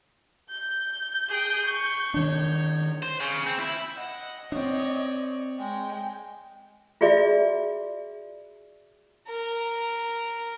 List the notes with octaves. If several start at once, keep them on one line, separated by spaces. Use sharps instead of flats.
G6
G#4 G5
C#6
D#3 D4 C#5
C5
C#3
C4
E4
D#5 F#5
C4 D4 C#5 D5
G#3 G5
F4 F#4 G#4 D5 E5
A#4